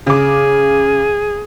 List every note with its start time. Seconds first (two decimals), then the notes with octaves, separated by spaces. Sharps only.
0.07 C#3 G#4 D6